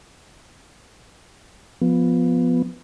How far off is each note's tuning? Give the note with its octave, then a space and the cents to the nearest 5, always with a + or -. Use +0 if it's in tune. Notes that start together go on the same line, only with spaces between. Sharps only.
F3 +10 B3 +0